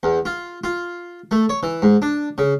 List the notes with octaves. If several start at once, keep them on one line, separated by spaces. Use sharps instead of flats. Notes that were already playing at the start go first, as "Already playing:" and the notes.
E2
F4
F4
A3
C#5
E3
G#2
D4
C#3